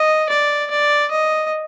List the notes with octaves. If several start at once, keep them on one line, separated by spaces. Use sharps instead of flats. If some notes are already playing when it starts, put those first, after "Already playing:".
Already playing: D#5
D5
D5
D#5